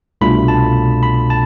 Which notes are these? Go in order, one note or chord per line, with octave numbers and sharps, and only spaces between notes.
C2 B2 A3 D4 F4 B5
A5
B5
A5